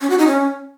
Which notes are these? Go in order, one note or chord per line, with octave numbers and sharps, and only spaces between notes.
C#4
F#4
D#4
C#4